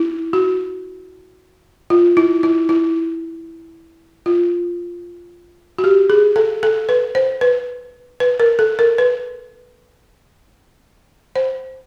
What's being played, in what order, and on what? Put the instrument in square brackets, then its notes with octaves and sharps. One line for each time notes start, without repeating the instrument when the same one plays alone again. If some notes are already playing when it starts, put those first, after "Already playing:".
Already playing: [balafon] E4
F#4
F4
E4
E4
E4
F4
F#4
G4
G#4
A4
A4
B4
C5
B4
B4
A#4
A4
A#4
B4
C5